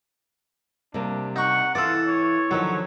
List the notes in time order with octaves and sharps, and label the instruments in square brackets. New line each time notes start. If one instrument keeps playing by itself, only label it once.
[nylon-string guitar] C3 G3 A#3 [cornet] D4
[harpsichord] D#4 C#6 [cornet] F#5
[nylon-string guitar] E3 [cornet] F4 [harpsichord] A4 D5
[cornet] C#5
[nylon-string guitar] D3 D#3 F3 [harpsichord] F#3